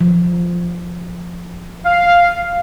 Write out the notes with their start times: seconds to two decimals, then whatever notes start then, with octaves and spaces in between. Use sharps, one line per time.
0.01 F3
1.85 F5